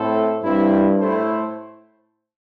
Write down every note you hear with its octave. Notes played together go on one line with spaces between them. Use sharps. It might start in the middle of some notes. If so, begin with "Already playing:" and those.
Already playing: A2 A3 C4 E4 A4 C5
G2 G3 C4 E4
A2 A3 E4 A4 C5